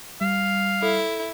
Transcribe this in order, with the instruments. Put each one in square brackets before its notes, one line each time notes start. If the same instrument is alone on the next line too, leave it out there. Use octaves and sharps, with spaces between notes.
[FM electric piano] G3 [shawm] F5
[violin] E4 [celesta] A4